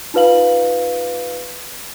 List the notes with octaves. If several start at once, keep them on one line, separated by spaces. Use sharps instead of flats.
D#4 F4 B4 F5 F#7